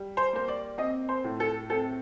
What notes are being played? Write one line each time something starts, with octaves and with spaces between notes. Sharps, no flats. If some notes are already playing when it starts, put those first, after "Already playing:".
Already playing: G3
C5
A#3 C5
D5
C4 D#5
C5
A2
A4
C4 A4